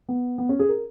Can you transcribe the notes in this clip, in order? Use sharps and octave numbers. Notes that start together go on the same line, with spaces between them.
B3
B3
C#4
G#4
A#4